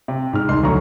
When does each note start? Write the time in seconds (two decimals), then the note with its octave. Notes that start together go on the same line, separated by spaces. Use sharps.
0.08 C3
0.33 G#2 F6
0.49 C2 D#4 C6
0.64 D2 F#3 A#5 C#6